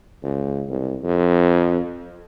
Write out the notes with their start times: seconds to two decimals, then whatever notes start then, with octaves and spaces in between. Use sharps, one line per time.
0.23 C#2
0.69 C2
1.03 F2